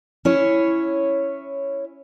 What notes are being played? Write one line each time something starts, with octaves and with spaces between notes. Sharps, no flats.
C#4 E4 C#5